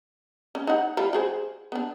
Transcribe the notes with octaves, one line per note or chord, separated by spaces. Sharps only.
C#4
D#4 F#5
G3 E4 F4
F#4 G#4 C5
B3 D4